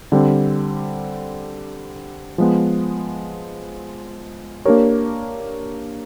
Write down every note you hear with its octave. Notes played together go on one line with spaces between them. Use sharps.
D3 G3 C4
F3 G#3 B3
A#3 D4 G4 A#4 C#5